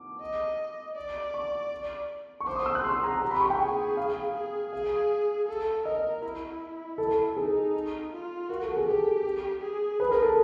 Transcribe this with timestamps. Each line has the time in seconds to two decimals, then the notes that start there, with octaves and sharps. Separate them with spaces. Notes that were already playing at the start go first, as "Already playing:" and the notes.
Already playing: D6
0.21 D#5
0.96 D5
1.34 C#6
2.40 C#6
2.47 C5 D6
2.56 D#6
2.66 E6
2.75 F#6
2.84 G#4 C6
3.03 A#5
3.21 G4 A#5
3.31 B5
3.41 C#6
3.50 G5
3.60 G#4
3.97 F5
4.35 G#4
4.73 G#4 F5
5.48 A4
5.85 A#4 D#5
6.23 E4
6.98 A4
7.37 D#4 G#4
8.12 F4
8.49 F#4 A#4
8.63 A4
8.77 G#4
8.87 G4 A4
9.62 G#4
10.00 B4
10.11 A#4
10.22 A4